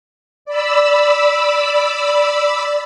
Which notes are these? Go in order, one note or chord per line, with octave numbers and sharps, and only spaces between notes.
D5 B5 E6